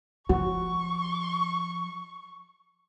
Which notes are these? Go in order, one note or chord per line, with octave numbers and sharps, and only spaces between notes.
F3 F#4 C#6